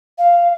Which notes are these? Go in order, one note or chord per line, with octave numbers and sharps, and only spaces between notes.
F5